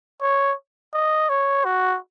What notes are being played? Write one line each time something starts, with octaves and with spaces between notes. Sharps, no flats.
C#5
D#5
C#5
F#4